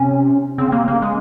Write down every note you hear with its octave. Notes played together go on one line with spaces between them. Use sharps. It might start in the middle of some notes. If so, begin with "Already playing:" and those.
Already playing: C3 C#4
C#3 C4
C3 A#3
C#3 A#3
G#3